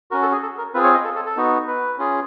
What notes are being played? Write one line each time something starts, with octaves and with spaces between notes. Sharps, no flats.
C#4 F#4 A#4
A4
G#4
A4
A#4
C4 F4 G#4 B4
C#5
D#5
A4
A4
A4
B3 D#4 F#4
B4
C#4 F4 G#4